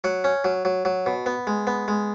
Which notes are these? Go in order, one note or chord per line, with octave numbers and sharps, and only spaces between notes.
F#3 F#5
C#4
F#3
F#3
F#3
B2
B3
G#3
B3
G#3